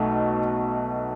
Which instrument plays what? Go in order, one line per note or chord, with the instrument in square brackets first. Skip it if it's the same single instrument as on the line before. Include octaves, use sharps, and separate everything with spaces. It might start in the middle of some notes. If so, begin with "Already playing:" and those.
Already playing: [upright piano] B1 B2 A3